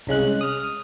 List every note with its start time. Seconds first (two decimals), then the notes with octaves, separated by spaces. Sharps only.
0.07 C2 C#3 G#3 F#6
0.41 D#6 F6